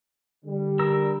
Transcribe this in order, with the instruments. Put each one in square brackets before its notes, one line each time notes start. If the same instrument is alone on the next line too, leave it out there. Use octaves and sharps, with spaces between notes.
[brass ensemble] D3 G3
[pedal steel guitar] A#4 E6